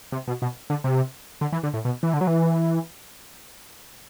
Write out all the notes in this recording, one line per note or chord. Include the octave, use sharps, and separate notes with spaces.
C3
B2
B2
D3
C3
D3
E3
D3
A2
B2
E3
D3
F#3
E3